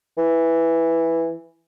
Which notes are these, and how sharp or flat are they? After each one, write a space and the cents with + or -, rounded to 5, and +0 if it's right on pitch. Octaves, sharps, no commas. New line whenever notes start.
E3 +0